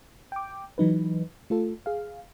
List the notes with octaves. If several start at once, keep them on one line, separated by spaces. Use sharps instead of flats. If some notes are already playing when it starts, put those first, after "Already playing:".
G5 D6
E3 F#3 D#4 B4
A3 F4 A4
G#4 F5